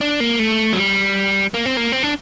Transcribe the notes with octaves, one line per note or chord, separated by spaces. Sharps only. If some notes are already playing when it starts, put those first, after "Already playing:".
D4
A#3
A3
F#3
G3
A#3
C4
A#3
C4
D4